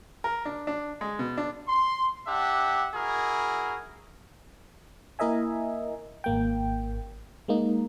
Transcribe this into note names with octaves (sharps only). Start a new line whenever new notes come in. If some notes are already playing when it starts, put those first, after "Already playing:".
A#4
D4
D4
G#3
B2
D4
C6
D4 G4 E5 F#5
E4 F#4 G#4 A#4
A#3 E4 A#4 D#5 E5 G#5
G#1 A#3 G5
G#3 A#3 D#4